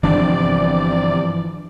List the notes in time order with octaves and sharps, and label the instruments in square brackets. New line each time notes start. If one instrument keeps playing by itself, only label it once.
[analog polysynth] G1 C3 D5 [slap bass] E3 F3 D4